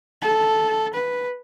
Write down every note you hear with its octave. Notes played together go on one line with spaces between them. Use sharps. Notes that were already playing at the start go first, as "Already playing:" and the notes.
A4
B4